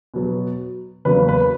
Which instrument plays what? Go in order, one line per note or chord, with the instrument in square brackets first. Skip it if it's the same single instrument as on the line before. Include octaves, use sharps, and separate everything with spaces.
[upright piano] B2 F#3 B3
E2 C#3 F#3 A#3 B4
B4